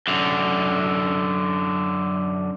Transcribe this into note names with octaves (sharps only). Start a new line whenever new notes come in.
F#2 D3